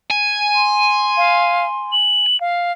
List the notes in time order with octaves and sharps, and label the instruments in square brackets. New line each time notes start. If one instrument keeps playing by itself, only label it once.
[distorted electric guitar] G#5
[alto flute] C6
[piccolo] F5
F#7
F5